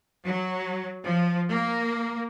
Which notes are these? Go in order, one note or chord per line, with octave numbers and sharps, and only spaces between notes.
F#3
F3
A#3